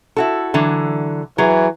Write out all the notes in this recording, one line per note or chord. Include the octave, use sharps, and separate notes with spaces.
E4 F#4 A4
D3 E3 F#3
E3 F#3 G#4